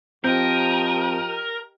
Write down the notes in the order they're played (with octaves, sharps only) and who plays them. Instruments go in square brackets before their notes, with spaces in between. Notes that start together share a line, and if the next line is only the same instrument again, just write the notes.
[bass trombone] F3 [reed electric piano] C4 G6 [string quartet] G4 D#5 G5 [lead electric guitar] A#4